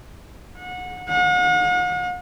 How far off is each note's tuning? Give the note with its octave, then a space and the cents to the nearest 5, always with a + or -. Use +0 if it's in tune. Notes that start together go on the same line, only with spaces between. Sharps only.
F#5 -25
F#5 -45